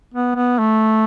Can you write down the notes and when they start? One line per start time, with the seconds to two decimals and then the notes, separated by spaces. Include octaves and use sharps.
0.14 B3
0.36 B3
0.59 A3